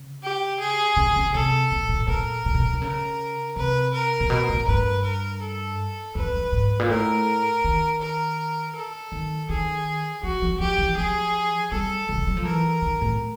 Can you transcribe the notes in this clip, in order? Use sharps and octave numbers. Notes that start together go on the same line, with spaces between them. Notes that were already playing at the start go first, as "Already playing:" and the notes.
Already playing: C#3
G4
G#4
C#3
C#3
C3 A4
A#2
A#2
A#2 A#4
A#2
B2
D3
C#3 A#4
C3 B4
A#4
A#2
B2
A2
G2 B4
A#4
A4
F2 B4
F#2
G#2
A#2
A2 A#4
D#3
A#4
A4
D#3
D#3 G#4
F3 F#4
F3
F3 G4
E3
F3 G#4
G3 A4
C#3
G3
F#3
F3
E3 A#4
D#3
A2